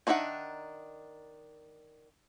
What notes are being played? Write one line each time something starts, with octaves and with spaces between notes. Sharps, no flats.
D#3 D4 D#4 E5 F#5